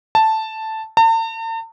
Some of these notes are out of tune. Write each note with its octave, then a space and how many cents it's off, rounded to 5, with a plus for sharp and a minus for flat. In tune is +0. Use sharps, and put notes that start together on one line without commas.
A5 +0
A5 +45